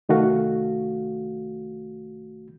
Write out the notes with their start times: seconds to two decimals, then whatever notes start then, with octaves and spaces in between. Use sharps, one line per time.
0.09 C2 D#3 A3 F#4 F5